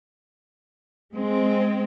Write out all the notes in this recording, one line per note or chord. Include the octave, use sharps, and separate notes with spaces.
G#3 C4